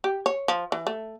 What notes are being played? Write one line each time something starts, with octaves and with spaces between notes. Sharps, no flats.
G4
C#5
F3
E3
A3